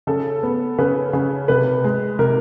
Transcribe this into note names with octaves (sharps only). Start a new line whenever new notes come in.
C#3 A4
B3
C#3 B4
C#3
C3 B4
G#3
C3 A#4